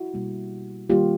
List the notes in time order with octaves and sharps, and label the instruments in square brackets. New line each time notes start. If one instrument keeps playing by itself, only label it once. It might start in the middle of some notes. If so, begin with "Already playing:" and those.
Already playing: [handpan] E4 F#4
B2 G3 A#3
D#3 G3 A#3 F4 G4